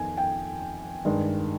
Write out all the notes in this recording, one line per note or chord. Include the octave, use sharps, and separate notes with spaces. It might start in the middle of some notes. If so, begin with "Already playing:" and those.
Already playing: F2 D#3 B3 G#5
G5
G2 D#3 G#3